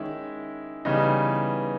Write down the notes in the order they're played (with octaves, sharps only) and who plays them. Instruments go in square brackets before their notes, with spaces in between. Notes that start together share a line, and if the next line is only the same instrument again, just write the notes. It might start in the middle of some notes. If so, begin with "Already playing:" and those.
Already playing: [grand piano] D#3 G#3 C#4 E4
C#3 E3 G3 B3 D#4